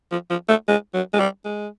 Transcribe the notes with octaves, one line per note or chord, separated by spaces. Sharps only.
F3
F3
A3
G#3
F#3
G#3
G3
G#3